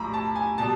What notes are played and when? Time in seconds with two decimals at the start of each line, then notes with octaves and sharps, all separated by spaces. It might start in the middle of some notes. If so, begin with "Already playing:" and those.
Already playing: B1 A2 F3 A#5 B5
0.13 A5
0.36 G#5
0.58 B2 G3 A5